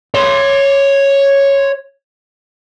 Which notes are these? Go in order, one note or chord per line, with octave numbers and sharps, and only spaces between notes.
C#5 C6